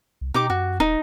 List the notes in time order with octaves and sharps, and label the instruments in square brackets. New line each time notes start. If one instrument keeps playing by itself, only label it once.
[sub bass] C2
[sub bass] B2 [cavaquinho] D#4 G4 D6
[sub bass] F#2 [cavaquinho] F#4
[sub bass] D#1 [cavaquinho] D#4